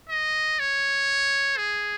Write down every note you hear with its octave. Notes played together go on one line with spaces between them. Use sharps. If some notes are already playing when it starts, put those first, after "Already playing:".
D#5
C#5
G#4